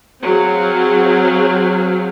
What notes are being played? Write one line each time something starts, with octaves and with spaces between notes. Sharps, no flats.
F#3 C4 G#4 F5